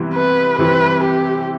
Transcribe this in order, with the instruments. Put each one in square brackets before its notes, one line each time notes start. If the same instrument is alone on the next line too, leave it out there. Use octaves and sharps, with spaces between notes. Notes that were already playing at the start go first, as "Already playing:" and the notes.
Already playing: [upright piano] C3 E3 G3 B3
[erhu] B4
[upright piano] C3 E3 G3 C4 [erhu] B4
[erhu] G4